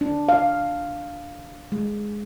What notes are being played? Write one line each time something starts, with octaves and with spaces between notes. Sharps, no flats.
D4
F5
G#3